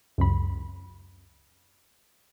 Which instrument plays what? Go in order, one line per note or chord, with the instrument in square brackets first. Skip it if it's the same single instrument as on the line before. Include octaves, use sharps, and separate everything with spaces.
[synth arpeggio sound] C#2 F#2 B5